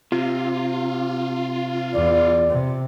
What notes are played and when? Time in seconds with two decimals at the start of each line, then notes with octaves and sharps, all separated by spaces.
0.12 C3 F4
1.94 E2 D5
2.50 C3